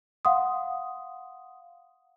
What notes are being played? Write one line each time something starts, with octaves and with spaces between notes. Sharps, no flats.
F5 F#5 C6 D#6